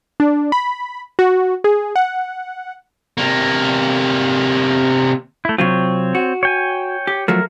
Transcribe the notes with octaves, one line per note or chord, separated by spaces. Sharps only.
D4
B5
F#4
G#4
F#5
C3 A#3
A3 E4
C3 F#3 C4 F4 C#5
F#4
C#5 G5 G#5
G4
F3 F#3 A3 A#4